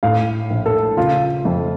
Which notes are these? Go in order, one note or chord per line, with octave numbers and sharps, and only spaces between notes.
A2 F5
A#1
A4
C#3 F4
F2